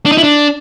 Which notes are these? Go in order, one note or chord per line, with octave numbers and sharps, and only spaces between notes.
D4
D#4
E4
D4